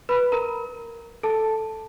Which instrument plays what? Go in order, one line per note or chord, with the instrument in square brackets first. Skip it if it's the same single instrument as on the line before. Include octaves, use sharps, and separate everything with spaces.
[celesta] B4 B5
A#4 A#5
A4 A5